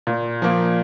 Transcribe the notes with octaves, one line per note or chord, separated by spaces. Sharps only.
A#2
F3 A#3